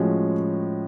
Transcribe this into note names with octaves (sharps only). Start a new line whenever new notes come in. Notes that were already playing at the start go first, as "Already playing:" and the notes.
Already playing: A2 F3 G#3 C#4 F#4